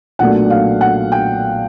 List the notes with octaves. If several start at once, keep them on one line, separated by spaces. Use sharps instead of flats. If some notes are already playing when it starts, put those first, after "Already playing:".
B1 A#2 F#3 A3 D4 F#5
F5
F#5
G5